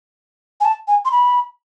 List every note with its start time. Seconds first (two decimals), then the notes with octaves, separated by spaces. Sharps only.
0.61 G#5
0.65 A5
0.88 G#5
1.05 C6
1.12 B5